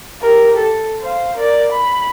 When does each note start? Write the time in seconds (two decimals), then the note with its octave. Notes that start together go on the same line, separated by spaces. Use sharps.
0.22 G4 A#4
0.57 A4
1.01 C5 F5
1.37 A#4 D5
1.73 B5